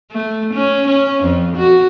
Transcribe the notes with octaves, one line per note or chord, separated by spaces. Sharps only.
A3
C#4
C#4
F2
F#4